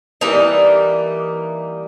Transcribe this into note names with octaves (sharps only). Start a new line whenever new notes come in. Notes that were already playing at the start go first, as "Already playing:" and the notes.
E3 G3 A#3 D#4